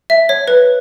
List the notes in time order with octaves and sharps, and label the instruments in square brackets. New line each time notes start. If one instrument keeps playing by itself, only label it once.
[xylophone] E5
C#5
B4